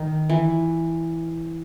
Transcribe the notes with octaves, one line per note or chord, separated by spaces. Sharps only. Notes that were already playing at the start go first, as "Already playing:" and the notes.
Already playing: D#3
E3